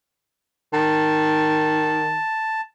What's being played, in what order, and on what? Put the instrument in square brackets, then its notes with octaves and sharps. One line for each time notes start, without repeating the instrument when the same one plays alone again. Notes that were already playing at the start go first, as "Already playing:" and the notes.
[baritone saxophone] D#3 [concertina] A5